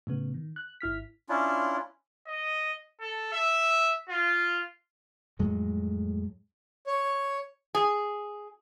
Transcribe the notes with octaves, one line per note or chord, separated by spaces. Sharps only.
A2 C#3 B3
D#3
F#6
G#1 E4 F6 B6
C#4 D4 E4 F4
D#5
A4
E5
F4
F2 A2 F#3 G#3
C#5
G#4